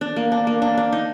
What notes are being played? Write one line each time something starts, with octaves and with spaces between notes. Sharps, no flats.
D4
A#3
D4
A#3
D4
D4
D#4